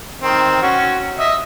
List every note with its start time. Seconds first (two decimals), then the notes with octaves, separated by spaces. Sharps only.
0.22 D#3 C4
0.62 C#4 F#4
1.18 D#5 E5